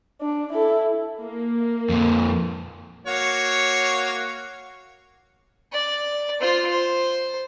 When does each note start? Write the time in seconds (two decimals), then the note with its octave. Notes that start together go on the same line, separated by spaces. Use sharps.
0.22 D4
0.53 E4 A4
1.22 A#3
1.89 F2 A#2
3.06 A#3 F#4 C#5
5.73 D5
6.41 F4 C5
6.70 C5